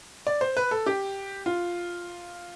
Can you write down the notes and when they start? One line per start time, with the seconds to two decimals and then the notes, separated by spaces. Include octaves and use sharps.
0.27 D5
0.41 C5
0.57 B4
0.71 A4
0.86 G4
1.46 F4